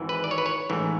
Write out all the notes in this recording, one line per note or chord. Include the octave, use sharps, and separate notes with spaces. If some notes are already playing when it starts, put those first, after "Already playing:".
Already playing: G#1 G#2 E3
B4
D5
C#5
B4
C#5
A1 G#2 E3